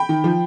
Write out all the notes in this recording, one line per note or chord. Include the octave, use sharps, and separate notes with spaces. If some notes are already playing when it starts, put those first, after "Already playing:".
Already playing: G5 B5
D#3
F3